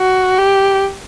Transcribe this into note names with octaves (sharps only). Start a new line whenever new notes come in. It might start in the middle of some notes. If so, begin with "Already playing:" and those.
Already playing: F#4
G4